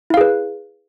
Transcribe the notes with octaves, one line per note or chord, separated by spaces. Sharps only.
E4 G#4 B4 F5